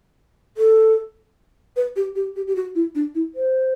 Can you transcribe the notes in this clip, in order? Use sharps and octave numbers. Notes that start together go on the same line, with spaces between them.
A4
B4
G4
G4
G4
G4
F#4
E4
D4
E4
C5